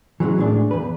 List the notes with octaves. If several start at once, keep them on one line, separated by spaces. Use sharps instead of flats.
E3 F#3 G#3 C#4
A2 D#3 G#3 D4
E2 B4